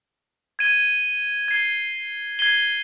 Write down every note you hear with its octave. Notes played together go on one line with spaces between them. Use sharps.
G#6 D#7 G7
G#6 C7 D#7 G7
G#6 C7 D#7 G7